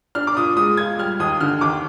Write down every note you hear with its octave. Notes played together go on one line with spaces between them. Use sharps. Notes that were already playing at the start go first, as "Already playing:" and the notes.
D4 F6
D6
A#2 D#6
G#3 D#6
F4 G#6
G3 F6
D#2 D#6
D3 F6
D#2 D6